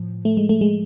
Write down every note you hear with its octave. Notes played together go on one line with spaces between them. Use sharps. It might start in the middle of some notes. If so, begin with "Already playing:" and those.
Already playing: A2 F3
A3
G#3
A3
G#3